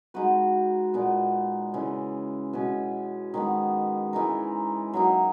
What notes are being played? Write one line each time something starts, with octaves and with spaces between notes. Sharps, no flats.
G#3 D#4 F#4 B4
A#2 G#3 B3
C#3 E3 G#3
B2 G#3 C#4
D#3 G#3 B3
E3 G#3 D#4 A#4
F#3 A#3 D#4